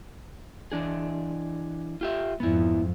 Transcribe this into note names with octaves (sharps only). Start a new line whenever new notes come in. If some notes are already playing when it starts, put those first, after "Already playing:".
E3 D4 G#4
F4 G4 E5
F2 G#2 B3 E4